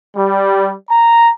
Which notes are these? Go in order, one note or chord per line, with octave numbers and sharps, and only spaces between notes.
G3
A#5